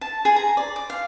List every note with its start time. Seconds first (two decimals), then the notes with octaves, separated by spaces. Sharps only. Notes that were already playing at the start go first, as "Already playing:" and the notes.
0.01 A5
0.25 G#4
0.36 A#5
0.57 D5
0.76 D6
0.90 F5